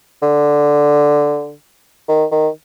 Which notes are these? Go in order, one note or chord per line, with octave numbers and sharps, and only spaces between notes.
D3
D#3
D#3